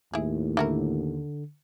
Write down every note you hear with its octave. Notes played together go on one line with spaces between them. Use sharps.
D#2 A2 E4 G#4
D3 E4 F#4 A#4